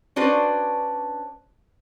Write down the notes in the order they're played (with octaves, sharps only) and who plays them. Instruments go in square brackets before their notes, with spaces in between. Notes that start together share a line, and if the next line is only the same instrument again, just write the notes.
[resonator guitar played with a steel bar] C#4 D4 F#4 B4 C5